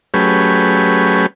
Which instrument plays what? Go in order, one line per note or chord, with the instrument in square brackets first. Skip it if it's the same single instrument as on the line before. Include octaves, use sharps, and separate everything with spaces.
[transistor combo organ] F#3 A3 C#4 G4 G#4 B4